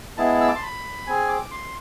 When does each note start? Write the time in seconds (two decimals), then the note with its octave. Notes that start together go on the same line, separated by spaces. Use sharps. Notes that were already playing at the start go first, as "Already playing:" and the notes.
0.17 G#3 B3 E4 G#4 A5
0.41 E6
0.48 D6
0.55 C6
0.62 B5
1.07 C4 G#4 G#5
1.28 D6
1.51 C6